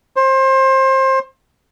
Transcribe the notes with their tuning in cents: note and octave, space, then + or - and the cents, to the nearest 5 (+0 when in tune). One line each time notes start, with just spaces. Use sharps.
C5 +25